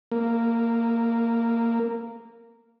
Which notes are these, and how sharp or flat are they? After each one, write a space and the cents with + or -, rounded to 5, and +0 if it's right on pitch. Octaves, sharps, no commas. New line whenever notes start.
A#3 -10